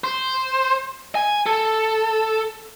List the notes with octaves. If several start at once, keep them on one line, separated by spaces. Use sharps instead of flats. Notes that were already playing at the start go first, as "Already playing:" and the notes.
C5
G#5
A4